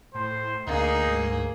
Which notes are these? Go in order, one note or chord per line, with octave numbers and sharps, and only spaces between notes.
A2 C5
D2 D3 A#3 D#4 G#4
G#2